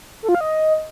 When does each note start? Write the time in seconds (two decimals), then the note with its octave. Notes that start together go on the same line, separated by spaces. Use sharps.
0.23 A4
0.29 F4
0.35 F5
0.41 D#5